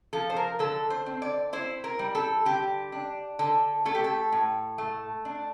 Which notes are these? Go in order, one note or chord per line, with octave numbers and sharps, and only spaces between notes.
F3 A4
C5
A#4
D3 A4
C5
C4
D5
E4 C5
A#4
G3
A4
D3 G4
D4
D3 A4
A3 A4
G4
A4
A2
A3
D4